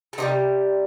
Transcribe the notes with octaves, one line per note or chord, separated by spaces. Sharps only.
A4
C3 D#3 G3 D#4 G4